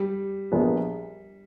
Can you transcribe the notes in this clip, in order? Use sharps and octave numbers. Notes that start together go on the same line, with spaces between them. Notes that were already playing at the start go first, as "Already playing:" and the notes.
Already playing: G3
A#1 A#2 G#3 B3